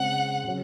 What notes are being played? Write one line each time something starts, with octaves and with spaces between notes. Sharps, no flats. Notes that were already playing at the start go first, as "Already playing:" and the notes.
Already playing: C#3 G#3 C4 F#5
C#3 F#3 C#4